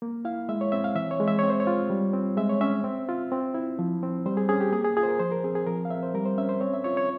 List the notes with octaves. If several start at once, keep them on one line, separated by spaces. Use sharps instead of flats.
A#3
E4 F5
G#3 E5
C#5
C4 E5
F5
E3 E5
C#5
G#3
E5
C4 C#5
C5
C#5
F4
G3
C4
G#3 E5
C#5
C#4 E5
C4
F4
C4
E4
F3
C4
G3 C5
G#4
C#4 G#4
G4
A#3 G#4
G#4
F4 G#4
C5
A#4
F3 C5
A#4
C4 G#4
G#4
F3 A#4
F5
C4 E5
C5
G3 A#4
C5
C#4 E5
C5
C4 C#5
E5
F4 C#5
C#5